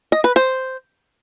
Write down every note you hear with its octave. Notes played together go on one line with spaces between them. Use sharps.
D#5
B4
C5